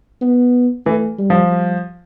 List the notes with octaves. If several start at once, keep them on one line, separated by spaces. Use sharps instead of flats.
B3
E3 A3
G3
F3
G3